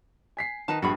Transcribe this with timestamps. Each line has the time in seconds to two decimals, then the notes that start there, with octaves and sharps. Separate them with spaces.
0.37 G#5 B6 C7
0.68 D#3 D#4 B4 A5
0.82 A#1 G2 F#4 G#4 B5